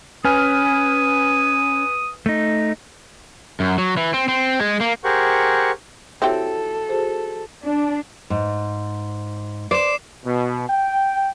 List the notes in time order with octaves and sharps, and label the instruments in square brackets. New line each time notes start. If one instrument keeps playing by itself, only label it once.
[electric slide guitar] C#4 [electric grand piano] B4 G#5 F6 [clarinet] D#6
[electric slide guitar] A3 D#4
F#2
F#3
E3
C4
C4
G#3
A#3
[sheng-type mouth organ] G4 G#4 A#4 C5 F#5 C#6
[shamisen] C4 E4 G4 [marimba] F#4 C#5 [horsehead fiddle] A4
[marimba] F#4 G#4 C5
[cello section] D4
[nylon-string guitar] G#2
[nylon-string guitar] C5 [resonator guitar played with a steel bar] D5 [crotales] C7 E7
[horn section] B2
G5